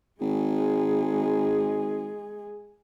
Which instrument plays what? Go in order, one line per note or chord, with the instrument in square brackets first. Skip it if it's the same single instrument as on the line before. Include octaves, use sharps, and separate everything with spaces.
[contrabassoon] G#1 [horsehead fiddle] G#3 G#4